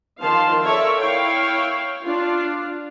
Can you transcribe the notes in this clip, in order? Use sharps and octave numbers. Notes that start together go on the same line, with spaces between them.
D#3 F3 F5 A5 C6
A4 A#4 C#5 D5 E5
E4 C#5 F5 G5
D4 F4